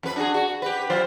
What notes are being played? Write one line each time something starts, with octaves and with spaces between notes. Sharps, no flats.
F2 B4
D4 F#4 G#4
F#4
G4 B4
F#3 F4 C5